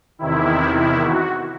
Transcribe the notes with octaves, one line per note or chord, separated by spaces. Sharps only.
E2 C3 D#3 E4
E4
F#4